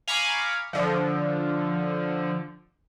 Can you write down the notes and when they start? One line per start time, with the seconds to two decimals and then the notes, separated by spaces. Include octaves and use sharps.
0.08 F5 G#5 A#5 B5 C#6 D6
0.73 D3 F3